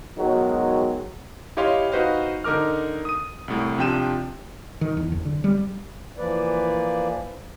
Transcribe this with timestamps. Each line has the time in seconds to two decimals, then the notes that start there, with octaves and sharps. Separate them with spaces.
0.17 B2 D#3 F#3 G#3
1.57 E4 G4 C#5 D#5 F5 C6
1.92 D#4 F#4 B4 C5 D#5 F5
2.44 D3 D#4 A#4 D6 F6
3.05 D#6 D#7
3.48 C2 A2
3.78 C3 F3 D4 G5 D#7 E7
4.81 D#3
4.97 E2
5.12 F#1
5.25 D3
5.44 G3
6.17 E3 F3 A#3 B4 D5